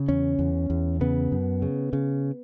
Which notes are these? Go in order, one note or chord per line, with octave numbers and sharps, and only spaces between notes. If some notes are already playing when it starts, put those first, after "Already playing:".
Already playing: C#3
E2 C#4
E2
E2
C#3 B3
F#2
C#3
C#3